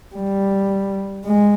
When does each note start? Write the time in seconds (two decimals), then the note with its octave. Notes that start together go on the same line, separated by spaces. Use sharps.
0.15 G3
1.26 G#3